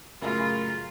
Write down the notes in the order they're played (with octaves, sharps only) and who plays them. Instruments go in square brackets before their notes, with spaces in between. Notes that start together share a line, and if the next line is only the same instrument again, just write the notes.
[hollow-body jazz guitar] F#2 F#4 G#4 [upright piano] A2 C#3 [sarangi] F4 [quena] A#4